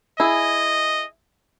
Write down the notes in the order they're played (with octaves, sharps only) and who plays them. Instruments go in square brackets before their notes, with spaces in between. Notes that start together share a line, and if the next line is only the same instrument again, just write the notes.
[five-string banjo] E4 G#4 [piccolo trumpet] D#5